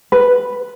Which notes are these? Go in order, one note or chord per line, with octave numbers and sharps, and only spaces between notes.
B4